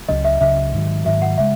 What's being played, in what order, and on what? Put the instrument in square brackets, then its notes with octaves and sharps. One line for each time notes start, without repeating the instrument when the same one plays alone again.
[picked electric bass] C#2 C#3 F#3 [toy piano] D#5
[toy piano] E5
[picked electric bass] C#2 C#3 F#3 [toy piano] E5
[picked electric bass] G#2 D#3 F#3
[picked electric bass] G#2 D#3 F#3 [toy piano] E5
[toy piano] F#5
[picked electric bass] C#3 G#3 [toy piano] E5